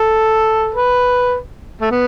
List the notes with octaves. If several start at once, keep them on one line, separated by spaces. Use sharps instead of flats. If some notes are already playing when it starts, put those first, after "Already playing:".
Already playing: A4
B4
A3
B3